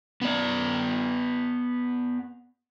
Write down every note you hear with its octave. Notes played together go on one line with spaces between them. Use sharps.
B3 D5